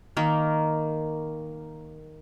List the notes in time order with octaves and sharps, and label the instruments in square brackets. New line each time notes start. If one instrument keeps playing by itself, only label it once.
[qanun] D#3 A#3